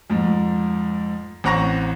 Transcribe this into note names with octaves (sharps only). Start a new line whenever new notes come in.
F2 G#2
A1 C4 F#5 A#5 C#6 A#6